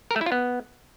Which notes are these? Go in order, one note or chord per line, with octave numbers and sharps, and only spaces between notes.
A#4
A3
E4
F4
B3